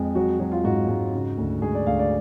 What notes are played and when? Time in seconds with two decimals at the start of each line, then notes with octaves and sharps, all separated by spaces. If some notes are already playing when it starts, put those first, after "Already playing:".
Already playing: F2 G#3
0.15 F#3 F#4
0.40 F#3
0.52 F4
0.64 G#2 F#4
0.88 G#2
1.13 C#3
1.38 D2
1.62 G#3 G#4
1.74 D5
1.87 D2 F5
1.99 D5